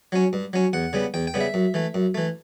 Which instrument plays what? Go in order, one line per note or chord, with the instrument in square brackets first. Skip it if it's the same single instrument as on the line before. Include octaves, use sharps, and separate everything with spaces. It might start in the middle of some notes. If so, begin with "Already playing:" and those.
[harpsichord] F#3 C#4
G2
F#3 C#4
E2 F#5
C#3 G3 B3
E2 G5
G5
C#3 G3 B3
E5
F#2
E3 A3
F#2
E3 A3